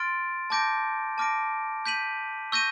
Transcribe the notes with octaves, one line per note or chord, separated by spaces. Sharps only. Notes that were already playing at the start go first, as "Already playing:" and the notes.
Already playing: C6 F6 A6 D7
A5 D6 G6 A#6 D7
A5 D6 F6 A#6 D7
G6 B6 D#7 F#7
C#6 E6 G6 A#6 D#7